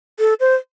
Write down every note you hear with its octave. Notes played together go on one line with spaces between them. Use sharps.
A4
C5